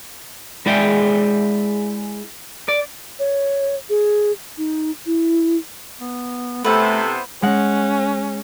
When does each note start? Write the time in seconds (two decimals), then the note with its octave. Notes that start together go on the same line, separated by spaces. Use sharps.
0.66 G#3 E4 G#4 D5 E5 G5
2.69 D5
3.19 C#5
3.90 G#4
4.58 D#4
5.06 E4
6.01 B3
6.64 C3 A3 B3 E4 A4 B4 C5 F#5
7.42 G#3 C#4 F#5 F#6